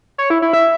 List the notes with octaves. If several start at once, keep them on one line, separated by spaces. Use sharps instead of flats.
C#5
E4
E4
E5